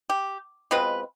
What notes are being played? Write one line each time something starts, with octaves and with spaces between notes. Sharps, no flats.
G4
B2 G#3 C4 F4 B4